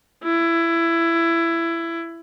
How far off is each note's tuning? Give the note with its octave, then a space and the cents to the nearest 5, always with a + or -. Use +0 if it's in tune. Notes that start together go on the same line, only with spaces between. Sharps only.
E4 +20